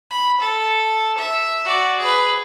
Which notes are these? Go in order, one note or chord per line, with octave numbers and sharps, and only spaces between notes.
B5
A4
E5
F#4 D5
G#4 B4